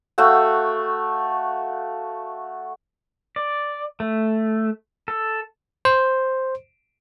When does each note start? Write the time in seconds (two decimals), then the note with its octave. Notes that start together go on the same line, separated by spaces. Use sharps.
0.18 A3 F#4 F5 G5
3.36 D5
4.00 A3
5.08 A4
5.85 C5